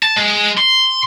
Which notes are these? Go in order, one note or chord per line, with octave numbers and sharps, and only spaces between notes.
A5
G#3
C6